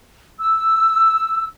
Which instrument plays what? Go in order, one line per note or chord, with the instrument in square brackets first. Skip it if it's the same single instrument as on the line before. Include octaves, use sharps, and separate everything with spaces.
[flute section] E6